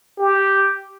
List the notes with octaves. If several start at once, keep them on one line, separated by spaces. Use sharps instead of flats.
G4